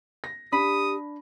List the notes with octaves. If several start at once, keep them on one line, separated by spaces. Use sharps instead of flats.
A#6
D4 G4 B5 D#6